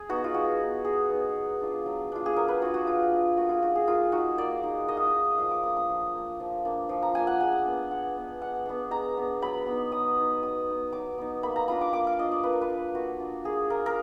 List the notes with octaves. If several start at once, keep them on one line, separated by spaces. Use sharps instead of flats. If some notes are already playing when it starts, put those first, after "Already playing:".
Already playing: G#4
B3 D#4 F#4
F4
G#3 F#4
B3 D#4
G#3 G#4
B3 D#4
F#3
D4 F4
F#3
D4 F4
G#4
F#3 A#4
B4
D4 F4 F#4
F#4
F#3 F4
D4 F4
A#3 F#4
F4
D#4 F#4
G#4
A#3 F4
D#4 F#4
A#3 D5
D#4
A#3 D#5
F5
D#5
D#4
F3 F5
D6
A#3 D4 D#6
D#6
F3
A#3 D4
F3
A#3 D4
F3
A#5
A#3 D4 G#5
F#5
G#3 G#5
B3 D4
G#3 F#5
B3 D4
G#3 F#5
B3 D4
G#3 A#5
B3 D4
F#3 B5
B3 D#4
F#3 D#6
B3 D#4
F#3 D#6
B3 D#4
F#3 D6
B3 D#4
A#3 B5
A#5
D4 F4 B5
D6
A#3 D6
F5
D4 F4 D#5
D5
A#3 B4
A#4
B4
D4 F4
A#3 F#4
D4 F4
A#3 G#4
F4 A#4
A#4